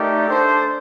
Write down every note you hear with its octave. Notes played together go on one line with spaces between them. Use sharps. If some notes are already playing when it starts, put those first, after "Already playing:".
Already playing: A3 D#4 G4 A#4 D5
D4 A4 C5